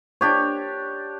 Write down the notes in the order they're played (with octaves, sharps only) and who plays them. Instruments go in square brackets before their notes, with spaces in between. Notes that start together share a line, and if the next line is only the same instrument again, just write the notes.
[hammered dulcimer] D4 G4 C#5